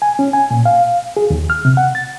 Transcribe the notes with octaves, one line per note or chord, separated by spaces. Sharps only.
G#5
C#4
G#5
A#2
F5
G#4
D#2
F6
C3
F#5
A6